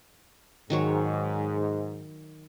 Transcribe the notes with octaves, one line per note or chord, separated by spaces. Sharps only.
G#2 D#3 F#3 C#5